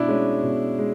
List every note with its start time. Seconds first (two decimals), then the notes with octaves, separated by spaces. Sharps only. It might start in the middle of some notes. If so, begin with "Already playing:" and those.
Already playing: B2 D4 E4
0.08 G#3 C#4
0.43 B2
0.78 G#3